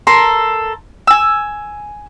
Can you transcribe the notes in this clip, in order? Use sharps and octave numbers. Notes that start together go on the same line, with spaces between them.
A4 A#4 C6
G#5 E6